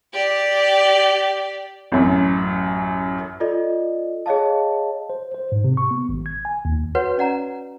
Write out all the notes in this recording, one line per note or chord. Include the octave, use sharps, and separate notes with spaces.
G4 D5
A1 F#2
F4 A4 D5 D#5
G#4 C#5 D#5 F5 A5
C5
C5
G#2
C3
C#6
B3
G#1
G#6
G#5
D#2
F#4 B4 C#5 F#5
C#4 D5 F#5 A#5